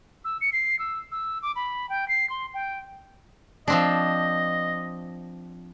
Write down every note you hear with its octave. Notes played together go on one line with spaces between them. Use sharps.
E6
C#7
C7
E6
E6
D6
B5
G5
C7
C6
G5
F3 C4 D4 D#5